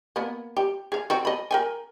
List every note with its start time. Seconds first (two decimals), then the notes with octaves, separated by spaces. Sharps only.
0.16 A#3 B3
0.57 G4
0.92 G#4 F5
1.10 C4 F#4
1.25 D#5 B5
1.51 A#4 G5 G#5